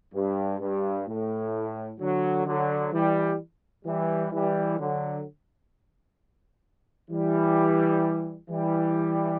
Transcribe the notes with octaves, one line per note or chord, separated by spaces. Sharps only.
G2
G2
A2
D3 F#3
D3 F#3
E3 G3
E3 G3
E3 G3
D3 F#3
E3 G3
E3 G3